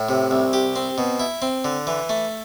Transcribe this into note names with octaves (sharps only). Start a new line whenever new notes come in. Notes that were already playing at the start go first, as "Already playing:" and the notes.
Already playing: A2
C3
C2
G4
C4
B2
E4
C4
D3
E3
A3